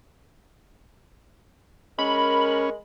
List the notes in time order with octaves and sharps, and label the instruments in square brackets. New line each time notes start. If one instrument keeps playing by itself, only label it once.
[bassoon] G#3 [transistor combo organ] C#4 [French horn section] A#4 [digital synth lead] B5